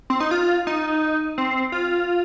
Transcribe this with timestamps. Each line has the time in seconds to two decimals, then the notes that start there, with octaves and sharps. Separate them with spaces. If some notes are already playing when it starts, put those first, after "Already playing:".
0.10 C4
0.20 D#4
0.31 F4
0.67 D#4
1.38 C4
1.72 F4